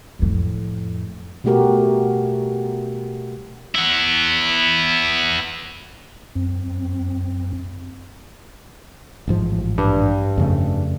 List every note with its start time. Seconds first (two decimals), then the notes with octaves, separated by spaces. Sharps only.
0.19 F2 A2
1.44 B2 G3 A3 F#4 G4 A#4
3.75 B3 E4
6.35 F#2 C4
9.28 A1 G#2 F3
9.78 G2
10.38 F2 C#3 A3